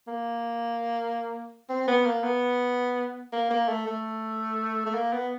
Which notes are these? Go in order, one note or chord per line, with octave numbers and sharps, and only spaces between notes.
A#3
C4
B3
A#3
B3
A#3
A#3
A3
A3
A3
A#3
B3